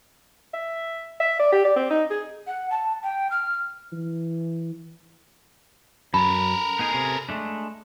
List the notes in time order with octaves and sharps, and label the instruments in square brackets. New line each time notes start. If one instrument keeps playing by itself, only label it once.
[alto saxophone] E5
E5
D5
G4
D5
C4
D#4
G#4
[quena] F#5
A5
G5
F6
[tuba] E3
[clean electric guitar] F#2 [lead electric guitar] A4 A#4 [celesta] B5
[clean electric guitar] B3 D#4 G#4
C3 C#4 G#4
G#3 A3 D4